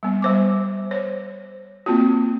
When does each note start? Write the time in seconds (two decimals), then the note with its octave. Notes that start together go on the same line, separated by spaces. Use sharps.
0.03 G3 B3
0.22 G3 C5 D6
0.91 C5 C#5
1.86 A#3 C4 F4 F#4